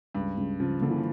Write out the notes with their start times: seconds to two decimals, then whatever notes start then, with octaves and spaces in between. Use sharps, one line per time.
0.15 C#2 G2
0.37 C#2
0.60 C#3 F3
0.81 D3 A#3
0.90 E3
0.96 F3